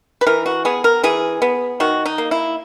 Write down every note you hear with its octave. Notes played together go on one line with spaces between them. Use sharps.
B4
E3 A#4
F#4
B3 G#4
A#4
E3 G#4
B3
D#3 F#4
D#4
A#3
E4